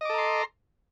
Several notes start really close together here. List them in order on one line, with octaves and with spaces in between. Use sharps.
D#5 D6 A4 A#5 C6